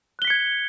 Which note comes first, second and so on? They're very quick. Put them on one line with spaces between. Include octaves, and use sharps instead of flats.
F#6 G7 B6 C#7 G#6